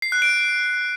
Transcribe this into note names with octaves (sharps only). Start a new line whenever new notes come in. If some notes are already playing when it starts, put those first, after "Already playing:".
C7
F#6
D7